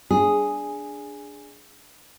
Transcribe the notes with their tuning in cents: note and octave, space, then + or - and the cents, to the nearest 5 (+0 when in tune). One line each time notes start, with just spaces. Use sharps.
D4 -5 G#4 +0